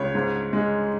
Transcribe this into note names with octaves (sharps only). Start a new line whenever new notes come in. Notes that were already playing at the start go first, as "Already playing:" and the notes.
Already playing: C#2 C#5
G#2
G#3